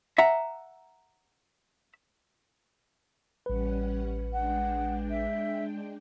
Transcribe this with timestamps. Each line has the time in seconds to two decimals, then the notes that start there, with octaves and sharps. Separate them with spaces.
0.18 E5 F#5 A#5
3.46 A1 G3 C#4 B4 F#5
4.32 G#3 D4 F#5 G5
5.10 E5